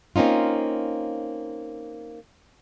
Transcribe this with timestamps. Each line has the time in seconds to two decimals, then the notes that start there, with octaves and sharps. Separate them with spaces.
0.16 A#3 C4 C#4 D#4 F4